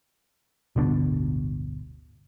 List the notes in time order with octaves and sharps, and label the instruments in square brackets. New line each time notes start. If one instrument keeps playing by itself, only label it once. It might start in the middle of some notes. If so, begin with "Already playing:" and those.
[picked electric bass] D1 G1 B2 D3